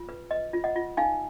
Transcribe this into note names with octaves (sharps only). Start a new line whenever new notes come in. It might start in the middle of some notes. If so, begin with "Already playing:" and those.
Already playing: F4
B4
B4 D#5
F4
D#5 F#5
F4
D#4 F5 G#5